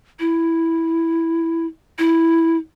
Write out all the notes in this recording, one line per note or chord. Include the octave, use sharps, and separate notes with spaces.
E4
E4